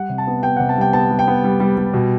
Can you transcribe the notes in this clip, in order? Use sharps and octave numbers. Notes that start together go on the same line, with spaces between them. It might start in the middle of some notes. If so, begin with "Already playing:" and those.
Already playing: G3 F#5
C3
A5
B3
B3 G5
C3 F#5
A5
G3 G5
B3 A5
G3
G5
B3
G3
G3
G3
B2